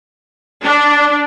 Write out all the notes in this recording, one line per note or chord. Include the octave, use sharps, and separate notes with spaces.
D4